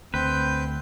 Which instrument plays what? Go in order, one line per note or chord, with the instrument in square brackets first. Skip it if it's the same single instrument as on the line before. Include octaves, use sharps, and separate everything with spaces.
[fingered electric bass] D2 [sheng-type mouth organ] C4 G6 [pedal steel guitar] B4